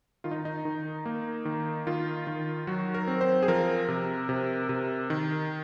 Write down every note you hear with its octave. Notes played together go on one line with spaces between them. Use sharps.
D#3 F4
D#4
D#4
D#3
A#3
D#3
D#3 F4
D#3
F#3 F#4
A#4
C4
C5
G#4
F3 A#4
C3
C3
C3
D#3